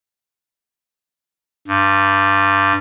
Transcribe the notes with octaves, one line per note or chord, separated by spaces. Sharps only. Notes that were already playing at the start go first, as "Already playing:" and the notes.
G2